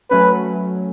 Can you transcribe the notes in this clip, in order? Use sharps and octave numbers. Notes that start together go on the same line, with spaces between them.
F#3 A3 C#4 B4